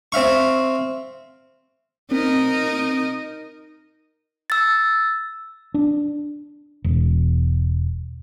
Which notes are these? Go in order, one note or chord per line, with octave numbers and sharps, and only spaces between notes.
C4 E5 F5 C#6
C4 D#4 A#4 D#5
E6 A6
D4
E1